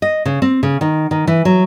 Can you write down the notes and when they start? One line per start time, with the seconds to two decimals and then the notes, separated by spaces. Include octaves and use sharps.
0.02 D#5
0.26 C#3
0.42 C4
0.63 C#3
0.81 D#3
1.11 D#3
1.27 E3
1.45 F#3